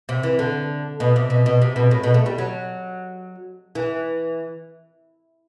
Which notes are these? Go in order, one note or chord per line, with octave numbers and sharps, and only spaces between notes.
C3
E3
D3
B2
C3
B2
B2
C3
B2
A2
B2
A3
G3
F#3
E3